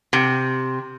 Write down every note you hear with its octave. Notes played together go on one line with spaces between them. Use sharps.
C3